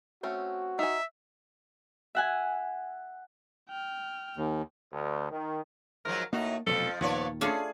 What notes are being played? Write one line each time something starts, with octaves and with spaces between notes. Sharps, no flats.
A3 C4 C#4 F#4
D#4 E5 G#5
E5 F#5 G#5
G5 F6
D#2
D2
D#3
G#2 F3 F#3 A#4
A2 A#3 D#4 F#4
F1 F2 B2 F3 F#3 A4
D#2 A#2 D#3 F3 B3 C#5 D5
A3 C#4 D4 F4 G#4